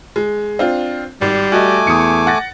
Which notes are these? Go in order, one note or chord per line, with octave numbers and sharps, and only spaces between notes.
G#3
C4 D4 F4
G#1 G3
A3 F#4 D#5 G#5 D6
E2 D#6 C#7
F#5 A6 A#6